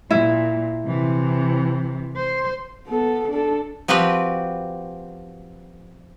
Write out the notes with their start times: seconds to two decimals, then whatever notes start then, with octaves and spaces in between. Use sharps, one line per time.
0.11 A#2 E4
0.86 C3 E3
2.16 C5
2.87 B3 A4
3.30 D4 A4
3.88 F3 C4 F#4 G4 B4